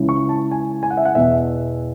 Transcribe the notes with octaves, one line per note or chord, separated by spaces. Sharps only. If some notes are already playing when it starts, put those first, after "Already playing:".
Already playing: C#2 C#3 E3
C#6
A5
G#5
G#5
F#5
E5
F#5
E2 B2 E5